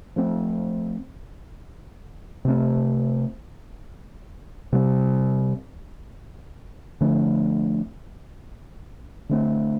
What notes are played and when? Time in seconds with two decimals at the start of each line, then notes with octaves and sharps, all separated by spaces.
0.16 F3 A3 C4
2.45 C3 A3 C4
4.73 C3 G3 C4
7.01 D3 F3 A3 C4
9.29 D3 A3 C4